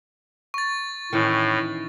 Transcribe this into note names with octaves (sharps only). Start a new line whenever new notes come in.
C#6 A6
A2 D#3 E3 C#4